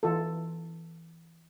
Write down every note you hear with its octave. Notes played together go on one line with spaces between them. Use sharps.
E3 F4 A4